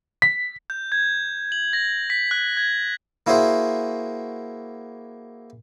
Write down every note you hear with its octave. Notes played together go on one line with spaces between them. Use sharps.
B6
G6
G#6
F#7
A#6
B6
F#6
G#6
A#3 E4 F#4 G#4 C5 E5